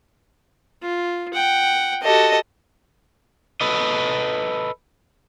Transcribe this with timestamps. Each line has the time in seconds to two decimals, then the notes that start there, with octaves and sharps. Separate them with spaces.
0.82 F4
1.33 F#5 G5
2.03 F#4 G4 A4 D#5
3.61 A4 B4 D#5